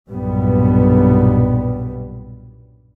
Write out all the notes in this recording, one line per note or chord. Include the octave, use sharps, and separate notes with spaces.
B1 G2 A#2 G3 B3